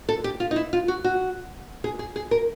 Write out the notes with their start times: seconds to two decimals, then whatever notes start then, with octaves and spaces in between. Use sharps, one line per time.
0.09 A4
0.24 G4
0.40 F4
0.51 D#4
0.56 E4
0.73 F4
0.88 F#4
1.04 F#4
1.84 G#4
1.99 G#4
2.16 G#4
2.31 A#4